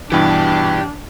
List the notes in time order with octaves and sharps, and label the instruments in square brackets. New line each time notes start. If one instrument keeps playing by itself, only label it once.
[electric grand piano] G2 B2 E3 [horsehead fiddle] D4 [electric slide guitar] G4 G5